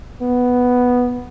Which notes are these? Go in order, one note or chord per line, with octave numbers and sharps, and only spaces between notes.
B3